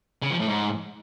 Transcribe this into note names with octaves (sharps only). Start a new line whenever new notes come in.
C#3
F3
A2
G#2